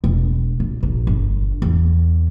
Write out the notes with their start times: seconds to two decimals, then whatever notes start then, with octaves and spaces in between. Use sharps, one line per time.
0.04 E1
0.60 A#1
0.83 A#1
1.07 G1
1.62 E2